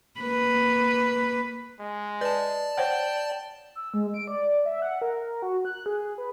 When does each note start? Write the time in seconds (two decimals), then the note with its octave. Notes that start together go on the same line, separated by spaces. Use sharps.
0.20 A#3 B4
1.79 G#3
2.21 B4 D5 A5
2.77 C5 C#5 F#5 G5
3.75 E6
3.94 G#3
4.14 D7
4.28 D5
4.65 E5
4.82 F#5
5.02 A#4
5.42 F#4
5.65 F#6
5.86 G#4
6.18 B4